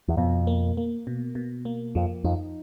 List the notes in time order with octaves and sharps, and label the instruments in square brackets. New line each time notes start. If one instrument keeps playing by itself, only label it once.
[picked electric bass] E2
[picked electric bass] F2 [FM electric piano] B2
[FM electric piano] A#3
A#3
B2
B2
A#3
[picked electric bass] F2 [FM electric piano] F3
[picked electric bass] F2 [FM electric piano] D#4